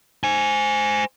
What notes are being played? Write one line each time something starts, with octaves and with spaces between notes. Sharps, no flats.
C5 G#5